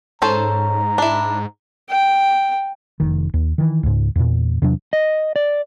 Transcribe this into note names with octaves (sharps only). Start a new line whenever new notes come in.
G#2 C#4 A4 C5 A#5
D4 E4
G5
F1 D#3
D#2
D#3 E3
C#2 G#2
E2 A#2
E2 C3 F#3 D4
D#5
D5